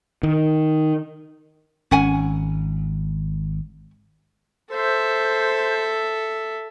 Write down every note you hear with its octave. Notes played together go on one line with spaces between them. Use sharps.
D#3
G#1 C#4 F#5 G#5
A4 C5 E5